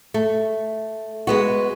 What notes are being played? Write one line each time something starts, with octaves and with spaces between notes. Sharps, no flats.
A3
G#3 B3 F#4